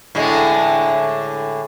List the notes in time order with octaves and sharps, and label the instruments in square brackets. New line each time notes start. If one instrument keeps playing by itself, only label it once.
[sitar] A2 D3 G#3